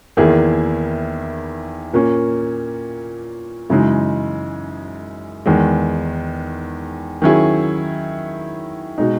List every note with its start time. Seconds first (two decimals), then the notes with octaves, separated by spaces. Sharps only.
0.17 E2 D#3 A#3 E4 G#4
1.93 A#2 A#3 C#4
3.70 F#2 C#3 E3 G#3 D#4
5.46 E2 D#3 G#3
7.22 D#3 F#3 C#4 E4 G#4
8.98 B2 G#3 D#4